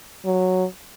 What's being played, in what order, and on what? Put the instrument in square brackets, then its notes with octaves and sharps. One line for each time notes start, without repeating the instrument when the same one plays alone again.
[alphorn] F#3